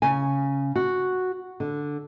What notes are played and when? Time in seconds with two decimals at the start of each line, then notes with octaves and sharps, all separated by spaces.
0.02 C#3 G#5
0.76 F#4
1.60 D3